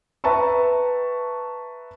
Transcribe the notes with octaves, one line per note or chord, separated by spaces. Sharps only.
B4 E5 G5 A5 A#5 C#6